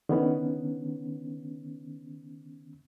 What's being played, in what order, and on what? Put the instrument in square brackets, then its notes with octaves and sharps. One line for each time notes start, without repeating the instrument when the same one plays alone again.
[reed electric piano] D3 D#3 B3 C#4